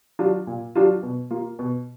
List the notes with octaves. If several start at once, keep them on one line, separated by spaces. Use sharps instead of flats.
F#3 D4 F4
A#2
F#3 D4 F4
B2
A#3 F4
B2